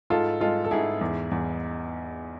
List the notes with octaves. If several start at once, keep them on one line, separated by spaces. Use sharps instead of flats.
G#2 F4 A4
G#3 F4 A4
A4
G#2 E4 G#4
E2
E2